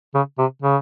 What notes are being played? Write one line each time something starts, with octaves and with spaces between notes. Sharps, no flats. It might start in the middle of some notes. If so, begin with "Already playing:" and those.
C#3
C3
C#3